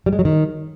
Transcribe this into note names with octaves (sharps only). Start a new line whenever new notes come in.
G3
G#3
F#3
D#3